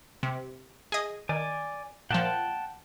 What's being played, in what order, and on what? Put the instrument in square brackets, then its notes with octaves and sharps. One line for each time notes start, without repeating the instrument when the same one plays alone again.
[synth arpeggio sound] C3
G#4 D#5
[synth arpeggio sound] D#3 [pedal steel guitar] D5 G#5
[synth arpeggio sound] A#2 F3 [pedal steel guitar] F#5 G5 A5